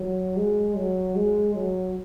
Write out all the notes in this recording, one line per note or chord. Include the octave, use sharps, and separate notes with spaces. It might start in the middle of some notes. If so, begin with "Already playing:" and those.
Already playing: F#3
G#3
F#3
G#3
F#3